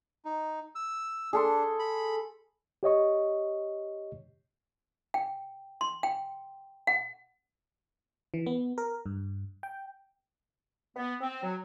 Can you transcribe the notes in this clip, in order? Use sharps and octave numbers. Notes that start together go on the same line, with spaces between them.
D#4
E6
D4 G#4 A4 C6
B5
G4 C#5 D#5 C#6
G5
C6
G5
F#5
E3
B3
A#4
G2
G5
B3
C4
F#3